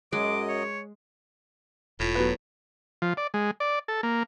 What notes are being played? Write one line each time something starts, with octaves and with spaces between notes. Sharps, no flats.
F#2 F#3 G#3 D#5 D6
C#5
E1 A2 F4
F#3 B3 B4
F3
D5
G#3
D5
A4
A#3